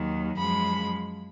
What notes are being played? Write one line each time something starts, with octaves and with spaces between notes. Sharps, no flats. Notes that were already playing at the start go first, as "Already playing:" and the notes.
Already playing: D#2 D#3 F#3
F#2 F3 G#3 B5